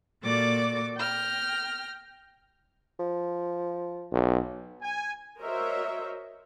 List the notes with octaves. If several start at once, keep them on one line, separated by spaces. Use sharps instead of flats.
A#2 F#4 A4 D5 D6 A6
G5 F6 A#6
F3
B1
G#5
F#4 A#4 C5 C#5 D#5 E5